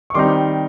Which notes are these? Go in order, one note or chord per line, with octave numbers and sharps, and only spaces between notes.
C#6
D#3 G3 C4 D#4 C6 D6